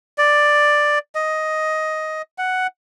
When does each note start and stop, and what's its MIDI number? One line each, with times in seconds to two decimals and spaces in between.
0.18 0.99 74
1.15 2.22 75
2.38 2.67 78